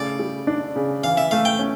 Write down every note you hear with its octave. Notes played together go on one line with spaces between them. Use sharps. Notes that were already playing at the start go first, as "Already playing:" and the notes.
Already playing: C#3 A3 E4 D5
G3
D4
C#3
E3 F5
E5
A3 F5
G5
C#4